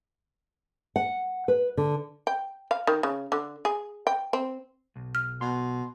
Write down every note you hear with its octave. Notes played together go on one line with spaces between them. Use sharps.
F#5
B4
D3
G5
F5
D#3
C#3
D3
G#4
G5
C4
B1
F6
B2 C6